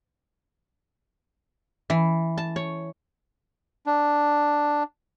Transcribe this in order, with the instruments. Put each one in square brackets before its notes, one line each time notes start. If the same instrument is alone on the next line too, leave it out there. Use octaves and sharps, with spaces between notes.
[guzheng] E3
A5
C#5
[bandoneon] D4